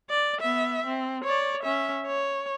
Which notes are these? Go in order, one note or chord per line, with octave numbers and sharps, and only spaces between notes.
D5
B3 E5
C4
C#5 D5
C#4 E5
C#5